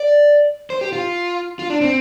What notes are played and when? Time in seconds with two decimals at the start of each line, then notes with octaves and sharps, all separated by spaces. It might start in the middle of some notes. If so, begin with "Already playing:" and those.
Already playing: D5
0.70 C5
0.81 G4
0.93 F4
1.59 F4
1.70 D4
1.81 C4